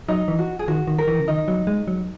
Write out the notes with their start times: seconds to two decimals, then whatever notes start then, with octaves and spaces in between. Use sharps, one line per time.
0.08 F#3 D#4
0.28 E3
0.39 F#4
0.59 G#4
0.68 D#3 F#4
0.87 D#3
0.98 A#4
1.08 E3
1.20 C#3
1.28 D#3 D#4
1.48 F#3
1.67 G#3
1.88 F#3